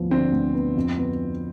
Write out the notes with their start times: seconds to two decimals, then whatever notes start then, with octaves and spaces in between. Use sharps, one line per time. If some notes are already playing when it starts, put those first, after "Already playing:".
Already playing: D2 F3 B3
0.10 D3 C4
0.32 D2
0.54 B3
0.77 F2
0.98 B3